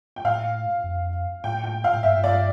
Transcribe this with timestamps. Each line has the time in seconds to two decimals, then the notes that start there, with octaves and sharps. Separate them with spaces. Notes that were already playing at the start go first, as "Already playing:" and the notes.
0.16 G5
0.25 A2 F5
0.84 F2
1.44 A2 G5
1.64 G5
1.84 F5
1.94 A2
2.03 G2 E5
2.24 D5